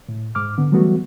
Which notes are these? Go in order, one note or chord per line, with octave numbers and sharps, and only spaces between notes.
A2
G#2 D6 F6
D3 B3
E3 F#3 G3 A3 B3 F#4